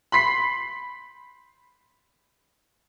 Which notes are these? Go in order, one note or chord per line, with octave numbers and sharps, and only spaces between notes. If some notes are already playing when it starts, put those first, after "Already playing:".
B5 C6 B6 C7